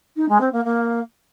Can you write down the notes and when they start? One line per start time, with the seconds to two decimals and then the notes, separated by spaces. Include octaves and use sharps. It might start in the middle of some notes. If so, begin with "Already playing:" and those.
0.16 D#4
0.28 G#3
0.40 C4
0.52 A#3
0.64 A#3